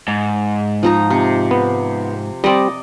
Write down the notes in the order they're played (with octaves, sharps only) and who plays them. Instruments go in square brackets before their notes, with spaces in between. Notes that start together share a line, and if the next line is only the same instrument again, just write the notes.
[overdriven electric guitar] G#2
[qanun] F3 D#4 A#5
C3
[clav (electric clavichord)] B3
[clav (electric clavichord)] G3 C4 [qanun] D5 D#5